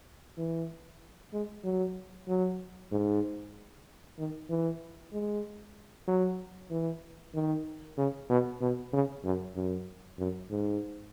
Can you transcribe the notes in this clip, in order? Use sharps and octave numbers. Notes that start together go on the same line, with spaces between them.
E3
G#3
F#3
F#3
G#2
D#3
E3
G#3
F#3
E3
D#3
C#3
B2
B2
C#3
F#2
F#2
F#2
G#2